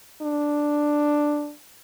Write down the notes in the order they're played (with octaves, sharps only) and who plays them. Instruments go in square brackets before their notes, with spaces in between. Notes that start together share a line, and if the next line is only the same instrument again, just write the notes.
[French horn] D4